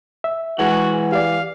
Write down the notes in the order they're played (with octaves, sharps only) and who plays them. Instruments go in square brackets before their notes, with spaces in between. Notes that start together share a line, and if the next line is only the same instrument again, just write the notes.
[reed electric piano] E5
[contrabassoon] E3 [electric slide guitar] G#3 G#4 F#5 [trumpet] F#4
[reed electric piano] G4 D5 [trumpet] F5